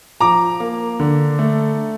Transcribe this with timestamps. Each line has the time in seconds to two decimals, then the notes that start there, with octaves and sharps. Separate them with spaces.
0.21 F3 A#5 D6
0.60 A#3
1.00 D3
1.39 A3